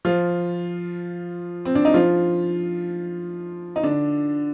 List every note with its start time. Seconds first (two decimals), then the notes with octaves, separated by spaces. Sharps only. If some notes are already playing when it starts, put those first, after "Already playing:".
0.05 F3 F4
1.65 C4
1.75 D4
1.85 D#4
1.94 F3 F4
3.76 D#4
3.83 D3 D4